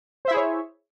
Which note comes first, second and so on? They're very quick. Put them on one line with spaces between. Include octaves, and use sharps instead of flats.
C5 E5 E4 G#4 C#5